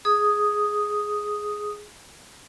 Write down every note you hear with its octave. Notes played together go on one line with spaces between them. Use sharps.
G#4 D#6